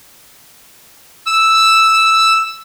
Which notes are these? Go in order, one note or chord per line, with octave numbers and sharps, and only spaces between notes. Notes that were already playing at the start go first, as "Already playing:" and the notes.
E6